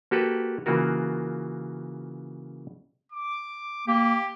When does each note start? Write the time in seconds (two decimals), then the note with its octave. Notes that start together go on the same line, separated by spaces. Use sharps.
0.11 A#3 F#4 G4 A4 B4
0.66 C#3 E3 A#3 F4 F#4 A#4
3.12 D6
3.88 A#3 G4